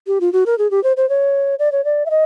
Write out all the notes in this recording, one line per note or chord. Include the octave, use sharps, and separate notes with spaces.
G4
F4
F#4
A#4
G#4
G4
C5
C5
C#5
D5
C#5
D5
E5
D#5